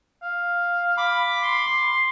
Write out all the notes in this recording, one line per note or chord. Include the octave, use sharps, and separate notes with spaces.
F5
B5 D6
C6